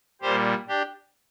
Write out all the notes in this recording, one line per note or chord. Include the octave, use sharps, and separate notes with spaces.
A#2 G3 G4 C5
D4 G4